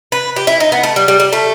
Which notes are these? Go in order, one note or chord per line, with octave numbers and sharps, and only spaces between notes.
B4
G4
E4
D#4
B3
A3
G3
G3
G3
A3